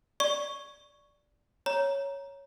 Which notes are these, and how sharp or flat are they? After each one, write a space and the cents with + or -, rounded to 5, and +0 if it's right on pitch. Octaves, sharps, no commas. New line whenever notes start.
D5 +0 C#6 +0
C#5 +0 A#5 +10